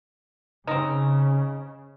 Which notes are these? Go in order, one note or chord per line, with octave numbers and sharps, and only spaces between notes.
C#3 C4 D#4